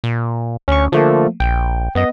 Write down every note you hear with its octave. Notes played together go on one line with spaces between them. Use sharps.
A#2
D2 C#4 C#6
D3 F3 A3 A#3
A#1 G5
F#2 B3 D#5